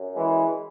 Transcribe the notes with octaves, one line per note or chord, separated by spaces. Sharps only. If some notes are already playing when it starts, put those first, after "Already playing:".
Already playing: F#2
E3 G#3